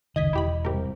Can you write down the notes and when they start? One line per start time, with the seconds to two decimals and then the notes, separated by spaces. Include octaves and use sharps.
0.16 F#1 C#2 D#3 D#5 D#6 G#6 B6
0.33 E1 E4 G4 B5
0.65 C2 G#2 G4 A#4